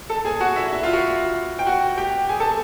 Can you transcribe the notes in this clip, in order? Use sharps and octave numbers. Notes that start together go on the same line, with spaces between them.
A4 A5
G#4 G#5
F#4 F#5
E4 E5
E4 E5
F4 F5
F#4 F#5
G5
F#4 F#5
G4 G5
G#4 G#5
A4 A5